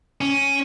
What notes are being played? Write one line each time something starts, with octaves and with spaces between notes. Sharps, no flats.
C#4